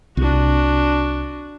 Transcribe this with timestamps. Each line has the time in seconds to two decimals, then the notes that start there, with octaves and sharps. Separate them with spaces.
0.17 C2 D4 F#4